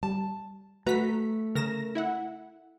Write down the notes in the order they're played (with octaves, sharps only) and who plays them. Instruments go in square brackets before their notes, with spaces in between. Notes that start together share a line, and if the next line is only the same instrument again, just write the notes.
[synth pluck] G3 [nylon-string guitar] A5
[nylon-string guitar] A3 [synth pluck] F#4 B6 [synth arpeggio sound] B4 A#5
[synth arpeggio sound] C#3 [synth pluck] A#4 A#6 E7
[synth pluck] E4 E5 F#5